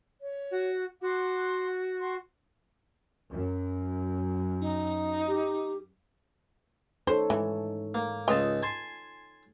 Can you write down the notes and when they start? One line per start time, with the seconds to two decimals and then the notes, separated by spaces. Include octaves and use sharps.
0.20 C#5
0.51 F#4
1.01 F#4 F#5 C6 D6
1.99 F#5 C6 C#6
3.30 F#2
4.60 D#4
5.28 G4
7.07 D#4 A4 C5 C#5
7.30 G#2 E3
7.94 A#3
8.28 C#2 F4 D#5 A5
8.62 G#5 A5 C6